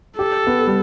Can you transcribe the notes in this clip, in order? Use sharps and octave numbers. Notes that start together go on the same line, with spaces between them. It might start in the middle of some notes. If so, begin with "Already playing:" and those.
G4 A4
B3
G3